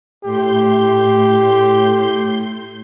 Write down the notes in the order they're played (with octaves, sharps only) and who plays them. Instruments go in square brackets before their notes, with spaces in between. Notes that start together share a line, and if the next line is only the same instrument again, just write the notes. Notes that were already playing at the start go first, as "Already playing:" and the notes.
[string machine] A2 C6 G6 [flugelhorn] G4